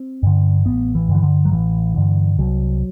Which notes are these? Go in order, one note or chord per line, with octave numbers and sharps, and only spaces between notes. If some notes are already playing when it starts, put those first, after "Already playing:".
Already playing: C4
G2 D3
A1 B3
E3
G2 D3
E3
D3
F#3
A1 E3
G2 D3
C2 F#3